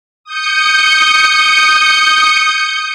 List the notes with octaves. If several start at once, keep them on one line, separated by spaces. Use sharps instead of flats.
D#6 G6 C#7